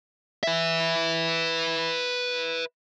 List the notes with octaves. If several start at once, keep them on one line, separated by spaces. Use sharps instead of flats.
B4 E5